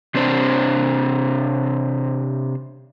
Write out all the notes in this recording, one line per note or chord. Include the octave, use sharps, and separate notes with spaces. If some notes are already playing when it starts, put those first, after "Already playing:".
C3 C4 D4 C5